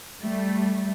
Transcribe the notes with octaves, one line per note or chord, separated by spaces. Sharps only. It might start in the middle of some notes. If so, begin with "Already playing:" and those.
G3 A3